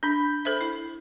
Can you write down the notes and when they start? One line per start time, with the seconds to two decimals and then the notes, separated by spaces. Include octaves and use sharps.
0.03 D4 B5 G6
0.45 A4 C5 E5
0.61 E4